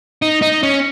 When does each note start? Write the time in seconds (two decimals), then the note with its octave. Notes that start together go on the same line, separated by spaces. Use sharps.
0.22 D#4
0.42 D#4
0.63 C#4